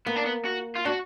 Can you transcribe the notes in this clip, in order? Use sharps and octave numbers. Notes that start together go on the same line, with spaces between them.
A#3 B3
D4
B3
F#4
F4
D4 F#4